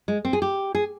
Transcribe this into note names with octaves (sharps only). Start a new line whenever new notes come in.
G#3
C4
G#4
G4
G#4